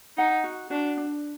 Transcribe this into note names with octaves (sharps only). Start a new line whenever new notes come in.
D#4 F#5
F#4
D4 F#4
D4